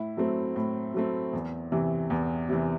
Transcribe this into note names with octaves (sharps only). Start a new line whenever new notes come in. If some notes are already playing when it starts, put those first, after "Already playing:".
Already playing: A2 E4
F#3 A3 C4
A2
F#3 A3 C4
E2
C3 E3
E2
C3 E3